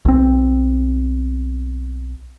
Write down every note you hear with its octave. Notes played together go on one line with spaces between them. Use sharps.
B1 C4